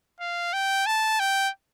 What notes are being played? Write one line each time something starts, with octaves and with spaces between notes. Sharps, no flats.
F5
G5
A5
G5